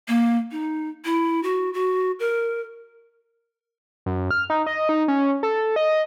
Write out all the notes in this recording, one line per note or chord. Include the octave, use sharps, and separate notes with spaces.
A#3
D#4
E4
F#4
F#4
A#4
F#2
F6
D#4
D#5
D#4
C#4
A4
D#5